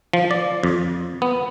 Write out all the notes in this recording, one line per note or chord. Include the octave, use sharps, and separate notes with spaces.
F3
D5
F2
B3